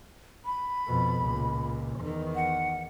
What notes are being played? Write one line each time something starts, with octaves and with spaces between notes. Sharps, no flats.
B5
F2 B2
C#2 A#2
E2 D#3
F#5